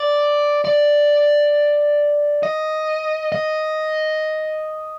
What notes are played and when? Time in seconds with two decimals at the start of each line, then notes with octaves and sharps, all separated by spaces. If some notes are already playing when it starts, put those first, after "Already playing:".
Already playing: D5
0.65 D5
2.43 D#5
3.32 D#5